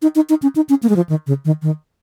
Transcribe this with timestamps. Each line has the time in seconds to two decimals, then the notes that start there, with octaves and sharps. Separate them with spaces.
0.02 D#4
0.15 D#4
0.29 D#4
0.42 C#4
0.56 D#4
0.69 C#4
0.83 A#3
0.89 G#3
0.96 F3
1.09 D#3
1.27 C#3
1.45 D#3
1.62 D#3